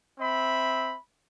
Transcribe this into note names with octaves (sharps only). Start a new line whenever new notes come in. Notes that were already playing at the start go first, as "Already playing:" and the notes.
C4 E5 B5